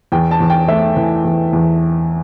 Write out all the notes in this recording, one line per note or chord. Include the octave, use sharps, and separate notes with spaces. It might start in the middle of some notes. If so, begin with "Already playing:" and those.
E2 G5
A5
E2
G5
A3 E5
E3
E2
E2